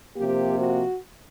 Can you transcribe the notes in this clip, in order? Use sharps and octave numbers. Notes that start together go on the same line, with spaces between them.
C3 F3 A#3 G4
F#4